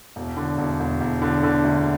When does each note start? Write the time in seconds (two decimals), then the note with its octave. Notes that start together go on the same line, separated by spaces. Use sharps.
0.16 E1
0.37 D3
0.58 E1
0.80 E1
1.01 E1
1.22 D3
1.43 D3
1.64 D2